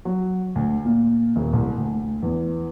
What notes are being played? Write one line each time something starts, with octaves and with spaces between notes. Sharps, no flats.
F#3
D2
A#2
D#1
C2
D2
E2